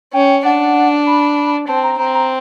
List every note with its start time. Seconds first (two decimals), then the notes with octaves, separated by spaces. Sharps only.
0.14 C#4 G5
0.45 D4 F#5
1.07 B5
1.68 C4 A5
1.84 A#5
1.99 C4 A#5
2.15 A#5